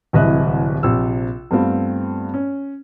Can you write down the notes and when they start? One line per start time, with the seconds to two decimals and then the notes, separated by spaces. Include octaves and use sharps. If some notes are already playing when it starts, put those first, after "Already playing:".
0.13 D1 C2 E3 D#5 E5 F#6
0.83 A#1 C3 E6
1.51 G2 A3 B3 C4 F4
2.34 C#4